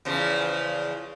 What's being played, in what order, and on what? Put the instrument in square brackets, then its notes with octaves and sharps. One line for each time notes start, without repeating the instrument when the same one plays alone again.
[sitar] E2 C#3 F3